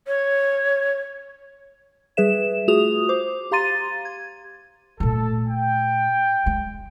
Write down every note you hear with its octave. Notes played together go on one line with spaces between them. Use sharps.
C#5
G3 G#4 B4 E5 E7
A3 F4 F#4 G#4 D#6 F7
C5 D6
G4 F5 A#5 C6 A6 D#7
G#6
A#2 A3 A4
G5
G#3